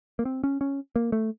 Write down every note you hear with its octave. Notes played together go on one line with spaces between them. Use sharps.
A#3
C4
C#4
C#4
A#3
A3